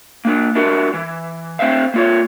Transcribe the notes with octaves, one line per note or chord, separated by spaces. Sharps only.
A#3 D4
D4 E4 F#4 A#4
E3
C4 C5 E5 F5
A#3 F4 C#5